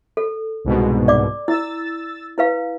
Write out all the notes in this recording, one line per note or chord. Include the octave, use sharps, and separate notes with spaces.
A4
C2 G#2 B2
D5 D6
E4 E6 A6
E4 B4 F5